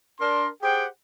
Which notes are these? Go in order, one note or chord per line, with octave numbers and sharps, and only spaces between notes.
D4 A#4 C6
G4 G#4 C5 F#5 G5